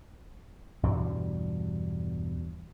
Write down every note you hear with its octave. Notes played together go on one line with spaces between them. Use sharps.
E2 G2 B2 G3